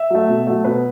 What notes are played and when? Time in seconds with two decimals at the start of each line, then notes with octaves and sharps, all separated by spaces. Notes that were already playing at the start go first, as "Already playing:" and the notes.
Already playing: E5
0.10 F#3 A3
0.29 B2
0.47 F#3 A3
0.64 B2 B4